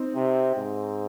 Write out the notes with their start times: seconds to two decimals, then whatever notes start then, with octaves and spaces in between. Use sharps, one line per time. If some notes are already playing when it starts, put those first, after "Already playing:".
Already playing: C4 D#4
0.16 C3
0.56 G#2